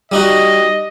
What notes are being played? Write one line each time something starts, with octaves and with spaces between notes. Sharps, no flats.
G3 D#4 F#4 D#5